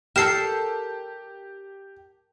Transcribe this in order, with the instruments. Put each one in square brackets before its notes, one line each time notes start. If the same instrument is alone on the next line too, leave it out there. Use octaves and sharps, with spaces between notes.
[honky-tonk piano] G4 [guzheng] A4 A#4 [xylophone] C7 E7